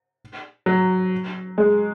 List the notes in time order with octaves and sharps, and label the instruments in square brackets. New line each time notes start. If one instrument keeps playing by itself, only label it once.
[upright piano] F#3
G#3